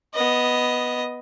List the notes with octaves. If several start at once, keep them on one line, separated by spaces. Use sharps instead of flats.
B3 D#5